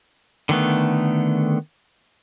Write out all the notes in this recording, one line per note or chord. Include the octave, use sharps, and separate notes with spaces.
D3 D#3 A3 B3